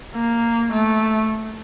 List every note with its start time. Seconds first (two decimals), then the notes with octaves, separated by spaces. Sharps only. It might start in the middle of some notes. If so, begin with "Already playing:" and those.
0.15 A#3
0.72 A3